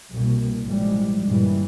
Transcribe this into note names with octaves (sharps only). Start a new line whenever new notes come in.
C2 B2 A#3
A1 F3 G3 G#3
G1 D#2 A#2 C#3 E3 G3